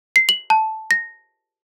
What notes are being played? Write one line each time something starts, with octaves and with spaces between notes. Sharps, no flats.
C7
F#7
A5
A#6